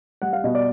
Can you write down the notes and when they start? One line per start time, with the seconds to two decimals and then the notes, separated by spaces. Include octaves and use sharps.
0.22 G3 F#5
0.33 F5
0.44 B2 D#5
0.55 D5